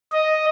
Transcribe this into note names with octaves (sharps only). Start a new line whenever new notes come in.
D#5